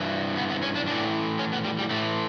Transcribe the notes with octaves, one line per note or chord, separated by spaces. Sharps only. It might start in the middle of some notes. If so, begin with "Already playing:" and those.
Already playing: G2 E3
B3
B3
C#4
D4
A2 E3 D4
C#4
B3
G3
G3
A2 E3 A3